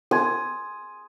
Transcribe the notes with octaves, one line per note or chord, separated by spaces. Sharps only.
G#5 C6 D#6 G#6